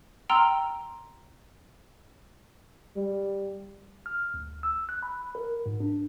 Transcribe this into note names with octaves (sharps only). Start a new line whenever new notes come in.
G5 A#5 C6 E6 F6
G3
F6
D2
E6
F#6
B5
A#4
G#2
D4